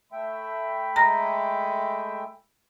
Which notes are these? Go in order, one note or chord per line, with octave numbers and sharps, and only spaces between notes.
A3 E5 G5 B5
G#3 A#5 A#6